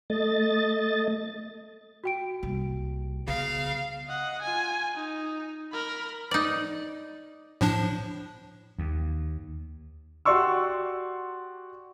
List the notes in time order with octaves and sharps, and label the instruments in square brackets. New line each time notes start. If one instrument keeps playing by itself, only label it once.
[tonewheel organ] A3 D#5 A6
[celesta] F#4 G5 D7
[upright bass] C2 A#3
[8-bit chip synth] C#3 [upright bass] B3 [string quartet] F5
[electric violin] D#5 F#5
F4 G#5
D#4
A#4 B5
[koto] D#4 D5
[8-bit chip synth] A2 F3 D4
[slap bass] D#2
[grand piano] F#4 G4 D5 C6 C#6 E6